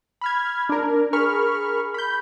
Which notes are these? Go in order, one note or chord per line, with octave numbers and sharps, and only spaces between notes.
B5 F6 G#6
D4 A#4
G#4 A#4 B5 C#6 F6
B5 G6